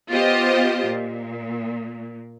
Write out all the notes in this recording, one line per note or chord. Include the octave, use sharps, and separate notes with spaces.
B3 F4 G4 C5 D#5
A#2